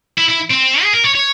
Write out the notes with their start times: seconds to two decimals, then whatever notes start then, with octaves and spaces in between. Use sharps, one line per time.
0.18 E4
0.29 E4
0.51 C4
0.83 G#4
0.94 A#4
1.04 C#5
1.15 C#5